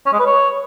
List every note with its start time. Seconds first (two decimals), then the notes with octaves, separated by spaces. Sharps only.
0.06 C#4
0.13 G#3
0.19 B4
0.26 C#5